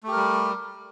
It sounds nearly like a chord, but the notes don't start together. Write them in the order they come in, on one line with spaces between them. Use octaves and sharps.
A3 G4 A#4 G3